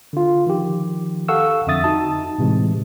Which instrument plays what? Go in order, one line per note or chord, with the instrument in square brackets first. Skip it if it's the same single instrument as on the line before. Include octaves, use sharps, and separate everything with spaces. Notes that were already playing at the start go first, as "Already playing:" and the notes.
[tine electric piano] D3 F4
D#3 F3 G4
A4 F5 F#5 C#6 E6
F2 D3 E5 D#6 A6
D#4 F#4 A5
A2 C3 E3 G#3